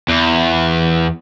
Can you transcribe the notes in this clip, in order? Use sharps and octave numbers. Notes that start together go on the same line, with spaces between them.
E2